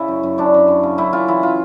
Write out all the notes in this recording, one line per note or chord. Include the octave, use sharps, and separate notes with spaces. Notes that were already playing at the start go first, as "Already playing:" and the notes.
Already playing: C#3 E4
F#2
F#2
F#2 D4
F#2
F#2
C#3
F#2 E4
F#2 F4
E3 E4
F4